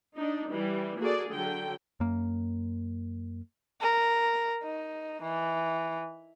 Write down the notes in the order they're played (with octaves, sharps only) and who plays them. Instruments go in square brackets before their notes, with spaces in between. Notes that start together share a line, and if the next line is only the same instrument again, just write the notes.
[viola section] D4 D#4
E3 G3
A#3 F#4 G#4 A4 D5
D3 F#3 A4 G5
[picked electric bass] F#2 A#3
[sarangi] A#4
D#4
E3